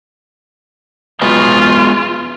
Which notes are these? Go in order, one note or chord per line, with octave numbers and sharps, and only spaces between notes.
F#3 G#3 B3 F4